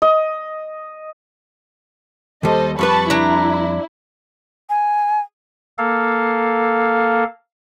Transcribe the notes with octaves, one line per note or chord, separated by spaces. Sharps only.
D#5
D#2 G3 A4 C5 D#5
F2 G3 B4 A5 B5 C#6
D4 E4 A#5
G#5
A#3 A4 F5